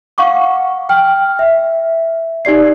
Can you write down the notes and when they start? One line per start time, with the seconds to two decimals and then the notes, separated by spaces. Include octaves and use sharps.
0.18 F5 F#5 C#6 D6
0.89 G5 F6
1.39 E5
2.45 D#4 G4 D5 C7